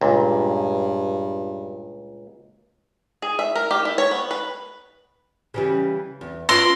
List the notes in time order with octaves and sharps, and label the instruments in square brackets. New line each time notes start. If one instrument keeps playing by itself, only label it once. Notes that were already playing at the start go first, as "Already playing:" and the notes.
[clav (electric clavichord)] C#2 A#2 [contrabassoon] G2
[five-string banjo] G#4
E5
A#4
G4
E4
C#5
B3
B4
[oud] C#3 E3 G3
E2
[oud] B3 C#4 F4 [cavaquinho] C6 [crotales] E6 A#6 D7